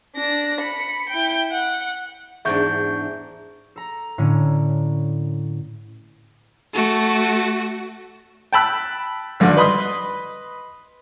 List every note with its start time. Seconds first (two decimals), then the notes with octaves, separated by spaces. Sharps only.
0.16 D4 A#6
0.60 B5 C#7
1.09 E4 G5
1.51 F#5
2.45 E2 G#2 D4 E5 C#6 G6
3.76 A4 A#5
4.18 A2 D3 C#4 D7
6.74 A3 F#4
8.53 G5 A5 B5 E6 F#6
9.40 G#1 G2 D3
9.57 B4 D#5 B5 C6 D#6